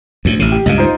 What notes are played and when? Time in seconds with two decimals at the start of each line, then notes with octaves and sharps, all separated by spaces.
0.25 D2 A2
0.39 A1 C3
0.52 G4
0.66 C#2 G2 C#3 D#5 F5
0.78 D#4 F4 C5